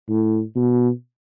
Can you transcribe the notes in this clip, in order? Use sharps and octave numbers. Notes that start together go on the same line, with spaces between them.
A2
B2